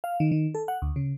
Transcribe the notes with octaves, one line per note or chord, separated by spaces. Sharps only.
F5
D#3
D#3
A4
F#5
D2
C#3